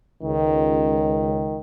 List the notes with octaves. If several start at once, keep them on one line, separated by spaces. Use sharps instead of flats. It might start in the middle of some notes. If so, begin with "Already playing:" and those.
C#2 D#3